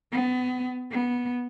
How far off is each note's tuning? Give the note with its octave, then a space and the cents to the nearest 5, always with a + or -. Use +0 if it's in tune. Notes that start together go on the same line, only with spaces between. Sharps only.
B3 +30
B3 -15